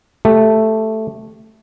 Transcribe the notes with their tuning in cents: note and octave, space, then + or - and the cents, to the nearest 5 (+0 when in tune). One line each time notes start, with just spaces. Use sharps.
A3 +0 G4 +0